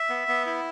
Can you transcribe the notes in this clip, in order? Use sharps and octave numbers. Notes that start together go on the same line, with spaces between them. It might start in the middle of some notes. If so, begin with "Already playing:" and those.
Already playing: E5
B3
B3
E4